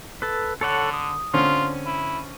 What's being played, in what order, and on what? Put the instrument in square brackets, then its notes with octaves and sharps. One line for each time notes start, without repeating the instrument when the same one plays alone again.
[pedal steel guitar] A4 B4
[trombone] D3 [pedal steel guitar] A4 C#5 F#5
[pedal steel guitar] D#6
[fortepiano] D3 C4 C#4 [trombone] F4
[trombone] E4